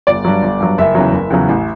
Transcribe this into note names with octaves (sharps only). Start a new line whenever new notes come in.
G1 D5
G2 F#3
G1
G2 F#3
F#1 E5
E2 C#3 F#3
F#1
E2 C#3 F#3
A1